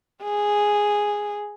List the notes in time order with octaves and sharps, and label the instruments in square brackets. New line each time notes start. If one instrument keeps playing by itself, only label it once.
[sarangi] G#4